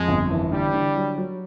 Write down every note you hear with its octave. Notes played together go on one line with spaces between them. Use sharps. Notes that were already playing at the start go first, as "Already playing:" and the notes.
Already playing: F2 G#3
G1
E3
D3 G3
D3
F#3
F#3